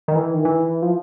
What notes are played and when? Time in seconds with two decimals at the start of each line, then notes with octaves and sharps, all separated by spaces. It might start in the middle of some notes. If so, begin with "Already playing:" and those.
0.08 D#3
0.15 E3
0.34 D#3
0.45 E3
0.82 F3